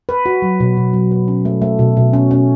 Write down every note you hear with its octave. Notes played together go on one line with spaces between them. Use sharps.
B4
F#4
F#3
B2
B2
F#3
B4
C#4
A3
A3
B2
B2
C#4
C#4